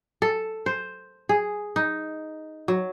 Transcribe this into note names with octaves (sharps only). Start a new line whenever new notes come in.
A4
C5
G#4
D#4
F#3